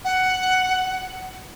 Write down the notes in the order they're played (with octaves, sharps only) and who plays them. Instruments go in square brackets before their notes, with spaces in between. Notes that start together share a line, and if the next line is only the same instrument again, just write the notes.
[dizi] F#5